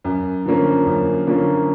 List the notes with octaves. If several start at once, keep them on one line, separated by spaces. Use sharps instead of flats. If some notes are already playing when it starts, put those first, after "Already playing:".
F#2
D3 F3 A#3 C#4
F#2
D3 F3 A#3 C#4